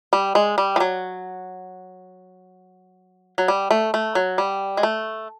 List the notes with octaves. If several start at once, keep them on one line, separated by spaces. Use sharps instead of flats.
G3
G#3
G3
F3
F#3
F#3
G3
A3
A3
F#3
G3
G#3
A3